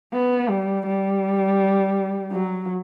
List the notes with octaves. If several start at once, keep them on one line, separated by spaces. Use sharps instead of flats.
B3
G3
G3
F#3